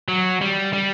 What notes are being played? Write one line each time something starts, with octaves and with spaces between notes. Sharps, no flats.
F#3
G3
G3